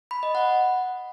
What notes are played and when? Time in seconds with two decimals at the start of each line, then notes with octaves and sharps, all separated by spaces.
0.11 B5
0.23 D#5
0.35 F#5